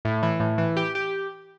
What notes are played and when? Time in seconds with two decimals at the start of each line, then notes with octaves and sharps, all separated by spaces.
0.05 A2
0.23 E3
0.40 A2
0.58 E3
0.77 G4
0.95 G4